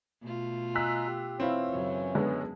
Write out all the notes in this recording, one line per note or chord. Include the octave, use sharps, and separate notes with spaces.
B2 A3 F4
D#5 G#5 A#5 E6 F#6 B6
G4
E3 C4 E4 F4 C#5
F#2 C#3
D3 G#3 B3